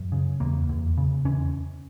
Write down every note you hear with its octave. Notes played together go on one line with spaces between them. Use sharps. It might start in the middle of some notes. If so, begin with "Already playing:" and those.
Already playing: F#2 F#3
C#3
E2 A#3
E2
C#3
E2 C#4